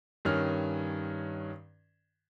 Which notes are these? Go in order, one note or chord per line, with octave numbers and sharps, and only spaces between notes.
G2 D#3 C#4 F6